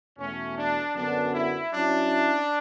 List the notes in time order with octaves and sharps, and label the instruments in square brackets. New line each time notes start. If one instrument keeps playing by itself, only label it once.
[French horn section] E2 B2 A3 [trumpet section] C#4
[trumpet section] D4
[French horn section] F#2 D3 F#3 B3 [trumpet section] D4
[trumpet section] E4
[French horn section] F#3 C#4 E4 [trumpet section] D4